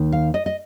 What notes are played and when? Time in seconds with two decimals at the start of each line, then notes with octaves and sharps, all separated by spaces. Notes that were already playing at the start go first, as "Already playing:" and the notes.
Already playing: D#2 D#3
0.12 F5
0.34 D#5
0.46 D#5